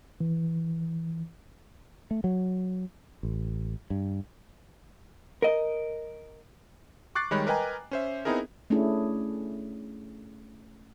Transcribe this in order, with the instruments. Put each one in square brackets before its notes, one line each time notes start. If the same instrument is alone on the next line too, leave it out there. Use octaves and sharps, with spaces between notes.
[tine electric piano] E3
[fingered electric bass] A3
F#3
A1
G2
[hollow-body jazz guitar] A#4 D#5
[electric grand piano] C#6 D6 F#6 A6 C7
D#3 G3 G#3 C#5 B5 F#6
A#4 B4 D#5 G5 G#5 A#5
C#4 C5 E5
B3 C4 D#4 E4 G#4 A#4
[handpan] A3 C#4 D4 E4 G#4